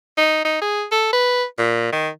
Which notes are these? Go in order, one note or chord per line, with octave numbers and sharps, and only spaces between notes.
D#4
D#4
G#4
A4
B4
A#2
D#3